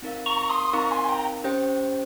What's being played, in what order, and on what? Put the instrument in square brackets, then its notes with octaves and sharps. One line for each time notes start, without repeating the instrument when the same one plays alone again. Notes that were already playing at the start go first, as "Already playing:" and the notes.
[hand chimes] C4 D#4 A#4 F5
[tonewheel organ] A#5 C#6
C6 D#6
[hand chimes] C4 D#4 A#4 F5 [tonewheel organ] A#5 C#6
[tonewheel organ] G#5 C6
G#5
G5 A#5
[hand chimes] C#4 G4 C5 G5